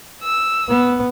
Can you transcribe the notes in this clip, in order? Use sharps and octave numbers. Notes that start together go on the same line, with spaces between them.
E6
B3